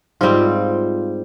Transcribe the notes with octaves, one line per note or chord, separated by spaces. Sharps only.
G#2 G3 C4 F4